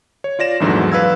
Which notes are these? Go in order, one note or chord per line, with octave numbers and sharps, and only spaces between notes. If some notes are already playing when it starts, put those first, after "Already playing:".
C#5
F4 D5 A#6 E7
A#1 E2 G#2 D3 E3 F#3
B4 F5 E6 G#6